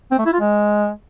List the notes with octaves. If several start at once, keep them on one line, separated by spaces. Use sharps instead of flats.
C4
A3
E4
F4
G#3